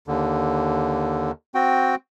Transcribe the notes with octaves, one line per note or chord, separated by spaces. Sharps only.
D#2 D3
C4 F#4 G5